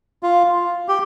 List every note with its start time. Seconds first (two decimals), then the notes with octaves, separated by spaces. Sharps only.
0.23 F4
0.89 G4